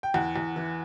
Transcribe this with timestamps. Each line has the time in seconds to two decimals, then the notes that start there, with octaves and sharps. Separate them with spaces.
0.03 G5
0.14 E2 F#5
0.36 E2
0.56 E3